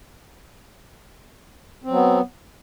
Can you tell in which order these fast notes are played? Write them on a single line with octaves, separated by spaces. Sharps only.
C4 F#3 B3